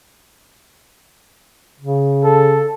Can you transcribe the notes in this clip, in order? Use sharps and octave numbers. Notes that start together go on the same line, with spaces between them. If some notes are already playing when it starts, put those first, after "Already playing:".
C#3
A4